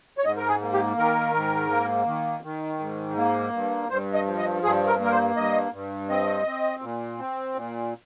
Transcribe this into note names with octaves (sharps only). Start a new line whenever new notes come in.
C#5
G#2 D#5
A#4
G#4
A#3
G4
D#3 A#4
G#2
A#3
D#3
D#3
G#2
A#3
G2
G2 C5
D#5
F3
D#5
G2 G#4
A#4
A#3
A#4
C5
G2 D#5
G2
C4 D#5
C4
A#2
C4
A#2